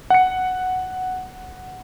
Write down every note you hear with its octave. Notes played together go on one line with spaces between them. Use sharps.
F#5 C#7